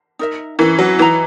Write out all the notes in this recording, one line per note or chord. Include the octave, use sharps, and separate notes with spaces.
D#4 A#4 E5
E3 C#4 E4 A#4
F#3
E3 E4 B4 D#5 A#5